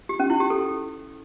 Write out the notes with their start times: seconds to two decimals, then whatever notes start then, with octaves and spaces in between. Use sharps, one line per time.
0.09 G4
0.20 C#4
0.30 E4
0.40 G4
0.50 A4